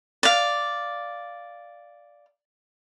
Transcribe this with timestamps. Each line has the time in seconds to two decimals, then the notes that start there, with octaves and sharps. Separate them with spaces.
0.23 D5 F5